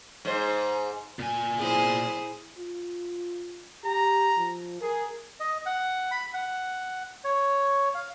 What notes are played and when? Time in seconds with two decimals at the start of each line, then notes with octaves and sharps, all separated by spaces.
0.25 G#2 C5
1.19 A#2 G#5
1.58 E4 G#4 C5
2.58 F4
3.84 G4 A#5
4.38 F3
4.81 G#4 A#4
5.40 D#5
5.66 F#5
6.11 B5
6.34 F#5
7.24 C#5
7.95 F5